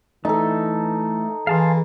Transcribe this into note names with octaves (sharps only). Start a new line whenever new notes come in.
E3 A3 D#4 A4
E3 G#4 F5 A5 C6